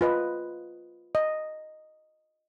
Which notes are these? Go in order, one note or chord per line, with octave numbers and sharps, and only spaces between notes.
F4 B4 D#5
D#5